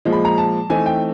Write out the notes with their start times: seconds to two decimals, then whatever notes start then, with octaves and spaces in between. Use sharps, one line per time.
0.05 A#2 F3 G#3
0.13 B5
0.25 A#5
0.38 A5
0.70 E3 A3 C4 D#4 G#5
0.86 G5